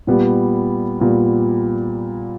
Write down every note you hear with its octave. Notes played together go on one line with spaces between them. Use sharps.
A#2 G3 B3
A#2 G3 B3